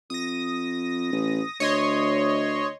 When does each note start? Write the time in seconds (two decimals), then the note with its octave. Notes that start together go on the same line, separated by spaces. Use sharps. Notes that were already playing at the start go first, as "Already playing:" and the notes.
0.10 F2 D#6 A#6
1.12 A1
1.60 D2 C#5 D#5 C6